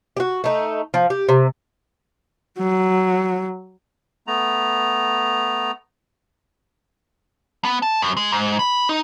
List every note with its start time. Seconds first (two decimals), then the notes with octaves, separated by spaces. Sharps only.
0.17 F#4 G4
0.44 A3 D#4
0.94 F3
1.10 G4
1.29 C3
2.59 F#3
4.27 A3 B3 A#5
7.65 B3
7.82 A5
8.02 F#2
8.17 G#3
8.32 G#2
8.59 B5
8.89 D#4